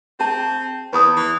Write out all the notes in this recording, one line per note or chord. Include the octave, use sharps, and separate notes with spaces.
C4 G#4 A5
E2 B4 D#6
E3